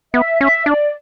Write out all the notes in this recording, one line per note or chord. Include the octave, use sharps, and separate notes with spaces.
B3 E5
C#4 E5
D4 D5